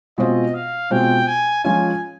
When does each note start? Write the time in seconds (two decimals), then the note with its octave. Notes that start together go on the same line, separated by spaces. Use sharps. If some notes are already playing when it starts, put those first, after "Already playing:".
0.18 B2 G#3 C4 F4 D#5
0.55 F5
0.90 B2 G#3 C4 F4 G5
1.27 G#5
1.64 F3 G#3 C#4 F4 G#5